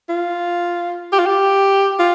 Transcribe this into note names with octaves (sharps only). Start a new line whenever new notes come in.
F4
G4
F4
G4
F4